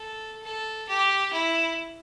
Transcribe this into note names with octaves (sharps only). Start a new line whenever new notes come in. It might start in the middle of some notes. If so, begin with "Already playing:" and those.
Already playing: A4
A4
G4
E4